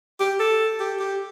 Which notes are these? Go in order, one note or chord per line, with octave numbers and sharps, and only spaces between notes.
G4
A4
G4
G4